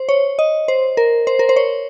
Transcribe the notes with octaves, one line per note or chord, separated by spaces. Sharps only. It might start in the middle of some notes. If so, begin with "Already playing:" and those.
Already playing: C5
C#5
D#5
C5
A#4
C5
A#4
C5
C#5